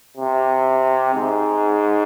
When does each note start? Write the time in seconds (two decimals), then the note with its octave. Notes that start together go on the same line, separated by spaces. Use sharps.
0.17 C3
1.15 G#2